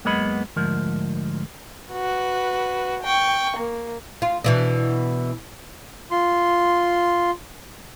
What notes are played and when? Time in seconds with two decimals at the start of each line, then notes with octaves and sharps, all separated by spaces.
0.05 F#2 G#3 A#3 B3 D#5 B5
0.56 D2 G#2 F3 A#4
1.91 F#4 B4
3.03 G5 C#6
3.57 A#3
4.22 F4
4.44 B2 E3 D4
6.11 F4 C6